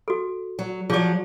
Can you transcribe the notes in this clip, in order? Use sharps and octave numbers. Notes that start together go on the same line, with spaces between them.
F#4 A4
F#3
F3 F#3 G#4 D5 D6